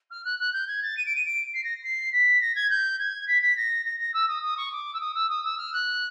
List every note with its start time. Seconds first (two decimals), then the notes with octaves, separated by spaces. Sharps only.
0.10 F6
0.24 F#6
0.39 F#6
0.53 G6
0.67 G#6
0.82 A6
0.97 D#7
1.06 D7
1.15 D#7
1.25 D7
1.54 C7
1.63 A#6
1.83 C7
2.12 B6
2.41 A#6
2.55 G#6
2.70 G6
2.99 G#6
3.27 B6
3.42 B6
3.56 A#6
3.85 A#6
3.99 A#6
4.14 E6
4.28 D#6
4.42 D#6
4.57 C#6
4.72 D6
4.93 E6
5.00 D#6
5.14 E6
5.29 D#6
5.44 E6
5.58 F6
5.73 F#6